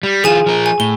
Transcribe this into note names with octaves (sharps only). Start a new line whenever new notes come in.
G3
E3 F4 G#4 G#5 E7
F3 A#4
G#5
A2 G7